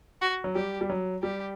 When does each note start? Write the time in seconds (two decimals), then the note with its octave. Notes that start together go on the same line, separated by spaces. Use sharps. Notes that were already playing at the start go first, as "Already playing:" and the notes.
0.21 F#4
0.44 F#3
0.55 G3 G4
0.81 G3
0.90 F#3
1.22 G3 G4